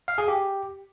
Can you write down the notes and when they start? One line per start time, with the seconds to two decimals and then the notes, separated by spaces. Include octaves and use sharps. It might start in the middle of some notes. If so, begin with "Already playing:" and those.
0.08 F5
0.18 G#4
0.28 G4